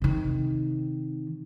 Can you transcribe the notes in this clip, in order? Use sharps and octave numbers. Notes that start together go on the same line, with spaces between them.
C3 D#3